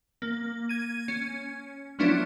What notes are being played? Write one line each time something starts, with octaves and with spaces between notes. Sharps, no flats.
A#3
G#6 D#7
C#4
F3 F#3 B3 C#4 D4 E4